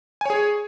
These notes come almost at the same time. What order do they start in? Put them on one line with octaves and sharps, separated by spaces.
G#5 C#5 G#4